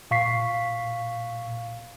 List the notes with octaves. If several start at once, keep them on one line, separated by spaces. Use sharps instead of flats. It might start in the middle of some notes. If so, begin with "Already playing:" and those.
A#2 F5 C#6 B6 C7